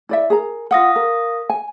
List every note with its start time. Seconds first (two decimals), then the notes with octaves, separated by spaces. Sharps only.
0.09 E4 D5 E5
0.30 G#4 A#4 A#5
0.71 F4 F5 F#5 D#6 A#6
0.96 A#4
1.50 G#5